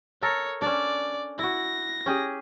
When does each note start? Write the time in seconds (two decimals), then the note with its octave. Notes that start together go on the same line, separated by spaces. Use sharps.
0.22 A4 A#4 C#5
0.62 C#4 D4 D5
1.39 E4 F#4 A#6
2.06 C#4 G4 G#4